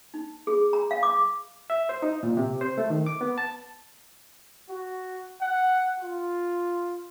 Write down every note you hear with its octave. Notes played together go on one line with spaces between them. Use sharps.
D#4
G#4
A#5
F5
D6
E5
C5
D#4
A#2
C3
C5
A3
D#3
D6
B3
A5
F#4
F#5
F4